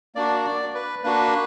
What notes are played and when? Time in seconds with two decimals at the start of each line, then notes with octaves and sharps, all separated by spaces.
0.15 A#3 D4 F#4 D5
0.45 D5
0.74 B4
1.03 A#3 D4 F#4 B4